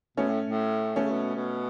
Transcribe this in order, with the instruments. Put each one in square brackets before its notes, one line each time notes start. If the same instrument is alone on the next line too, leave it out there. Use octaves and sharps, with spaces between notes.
[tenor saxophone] B2 [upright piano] A3 C#4
[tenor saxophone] A2
A2
[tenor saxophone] B2 [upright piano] A3 C#4
[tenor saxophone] C#3
B2
B2